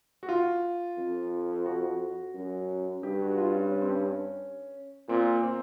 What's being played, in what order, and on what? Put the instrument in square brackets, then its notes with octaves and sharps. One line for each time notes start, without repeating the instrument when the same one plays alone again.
[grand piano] F#4
F4
[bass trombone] F2
[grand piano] F#4
[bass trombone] F#2
[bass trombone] G2 [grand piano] G4
[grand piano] F#4
F#4
F4
C#4
C#4
C4
C#4
[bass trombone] A#2 [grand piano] C4
[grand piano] C4